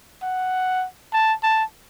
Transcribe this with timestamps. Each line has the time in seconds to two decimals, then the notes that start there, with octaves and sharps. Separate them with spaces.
0.23 F#5
1.13 A5
1.43 A5